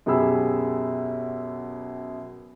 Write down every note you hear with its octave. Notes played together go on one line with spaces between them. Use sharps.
F#2 B2 G4 G#4 B5 E6